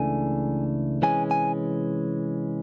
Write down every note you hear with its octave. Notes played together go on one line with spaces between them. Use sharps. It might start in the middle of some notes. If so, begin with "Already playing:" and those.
Already playing: C#2 C#3 E3 A3 D4 G#5
C3 E3 G#3 C#4 G#5
G#5